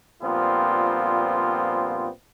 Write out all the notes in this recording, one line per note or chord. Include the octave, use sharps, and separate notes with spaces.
G2 A#2 F3 B3 C4 F4